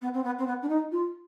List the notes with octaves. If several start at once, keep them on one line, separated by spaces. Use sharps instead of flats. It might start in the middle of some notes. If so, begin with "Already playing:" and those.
B3
C4
B3
C4
B3
D4
D#4
F4